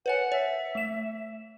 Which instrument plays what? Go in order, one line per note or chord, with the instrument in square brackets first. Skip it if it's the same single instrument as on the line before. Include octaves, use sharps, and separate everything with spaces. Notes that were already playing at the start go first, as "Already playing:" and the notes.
[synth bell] B4 C#5 G#5 [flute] F#5
[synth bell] C#5 [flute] E5
[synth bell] A3 E7